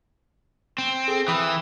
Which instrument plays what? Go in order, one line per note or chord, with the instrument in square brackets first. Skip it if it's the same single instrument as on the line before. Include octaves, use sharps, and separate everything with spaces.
[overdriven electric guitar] C4
[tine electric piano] G#4 A4
[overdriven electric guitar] E3 [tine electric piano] G5 B5 D#6